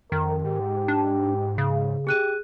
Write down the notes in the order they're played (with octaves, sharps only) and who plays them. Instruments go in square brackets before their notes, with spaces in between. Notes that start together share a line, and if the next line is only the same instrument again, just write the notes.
[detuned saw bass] F2 [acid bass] D#3 [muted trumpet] A#4
[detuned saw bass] G#2 [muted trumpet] G4
[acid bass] D4
C#3
[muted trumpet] G4 [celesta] G#4 F#6 D#7